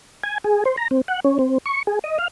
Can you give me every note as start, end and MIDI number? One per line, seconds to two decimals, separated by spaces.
0.24 0.38 80
0.44 0.64 68
0.65 0.76 72
0.77 0.88 82
0.91 1.01 60
1.08 1.20 78
1.24 1.38 61
1.39 1.58 60
1.66 1.83 85
1.87 1.99 68
2.04 2.18 75
2.19 2.28 77